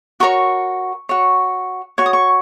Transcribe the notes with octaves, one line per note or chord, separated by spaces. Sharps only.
F#4 A#4 C#5 C#6
F#4 C#5
F#4 C#5 C#6
D#6
C#6